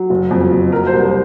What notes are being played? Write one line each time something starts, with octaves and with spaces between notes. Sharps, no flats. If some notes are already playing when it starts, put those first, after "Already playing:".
Already playing: F#3
F#1
F2
F#1
F#3 A#4
C5
C2
C5